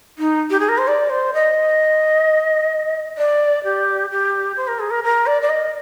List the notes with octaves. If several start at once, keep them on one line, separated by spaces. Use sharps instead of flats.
D#4
G4
G#4
A#4
C5
D5
C5
D#5
D5
G4
G4
C5
A#4
G#4
A#4
A#4
D5
D5
D#5